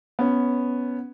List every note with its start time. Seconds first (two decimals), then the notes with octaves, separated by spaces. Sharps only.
0.19 B3 C#4